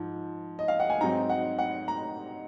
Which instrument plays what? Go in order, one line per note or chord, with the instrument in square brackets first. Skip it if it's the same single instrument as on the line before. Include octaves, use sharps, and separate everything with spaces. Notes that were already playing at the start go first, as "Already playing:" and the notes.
Already playing: [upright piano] G#2 F3
D#5
F5
F#5
G#5
G#2 F#3 C4 D#4 A#5
F#5
F#5
A#5